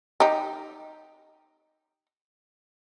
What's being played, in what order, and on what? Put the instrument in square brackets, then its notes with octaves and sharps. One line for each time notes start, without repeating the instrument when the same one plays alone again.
[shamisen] D#4 G4